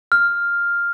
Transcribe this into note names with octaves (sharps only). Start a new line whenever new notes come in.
F6